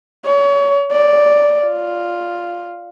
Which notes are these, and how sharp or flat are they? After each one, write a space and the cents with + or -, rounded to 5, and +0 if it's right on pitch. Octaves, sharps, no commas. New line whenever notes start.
C#5 +30
D5 +0
F4 +0